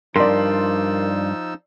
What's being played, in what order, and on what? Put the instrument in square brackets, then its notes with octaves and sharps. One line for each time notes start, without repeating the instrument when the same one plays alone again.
[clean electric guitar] G2 [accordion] F3 D#4 E6 [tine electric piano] A#4 [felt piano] D5 C6